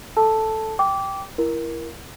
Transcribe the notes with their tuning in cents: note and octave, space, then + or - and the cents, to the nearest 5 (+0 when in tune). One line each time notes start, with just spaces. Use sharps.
A4 +0 A5 +0 E6 +0
G5 +0 D6 -20
E4 +25 A#4 +15